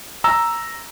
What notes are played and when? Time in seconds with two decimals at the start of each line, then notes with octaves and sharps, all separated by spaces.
0.24 A#5 E6